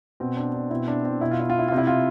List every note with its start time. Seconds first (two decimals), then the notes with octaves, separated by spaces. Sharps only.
0.20 B2 C4
0.37 D4
0.54 D4
0.71 B2 C4 E4
0.88 D4
1.04 C4 E4
1.21 B2 E4
1.31 F4
1.40 E4
1.50 F4
1.59 E4
1.68 C3 F4
1.78 E4
1.87 F4